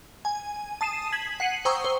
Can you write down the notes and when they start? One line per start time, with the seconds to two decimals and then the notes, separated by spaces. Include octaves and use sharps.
0.25 G#5
0.81 A5 D#6 C7 D#7 E7
1.12 G#6 B6 F#7
1.40 F#5 C7 C#7 D#7 F#7
1.65 C5 G5 A#5 C#6 D#6 E6
1.85 C5